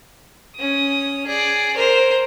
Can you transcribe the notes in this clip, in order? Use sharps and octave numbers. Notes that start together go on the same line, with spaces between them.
C#4 D#6
G#4 D5
A#4 C5